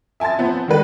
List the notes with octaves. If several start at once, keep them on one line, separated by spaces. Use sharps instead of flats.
E5 G#5 A5 C6 A6
F3 B3 C4
D#3 G#3 B4